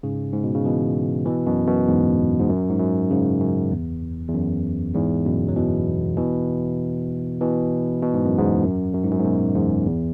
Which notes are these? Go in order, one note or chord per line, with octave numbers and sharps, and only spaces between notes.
G#2 C#3
G#2
B2
C#3
B2 E3
B2 E3
F#2 B2
F#2 B2
E2 G#2
G#2
F#2
G#2
F#2
G#2 C#3
F#2
E2
E2
F#2
E2 G#2
F#2 B2
F#3
B2 E3
B2 E3
B2 E3
B2
G#2
F#2
E2 G#2
F#2
F#2
G#2
F#2
G#2
F#2 B2
E2 G#2
E2